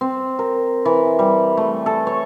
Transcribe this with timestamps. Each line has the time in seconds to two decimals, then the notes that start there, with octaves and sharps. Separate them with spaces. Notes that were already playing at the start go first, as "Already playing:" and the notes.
0.01 C4
0.39 A#4
0.85 E3
1.19 G3
1.57 A3
1.86 A4
2.07 C#5